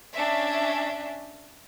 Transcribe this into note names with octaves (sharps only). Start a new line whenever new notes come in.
C#4 D4 E5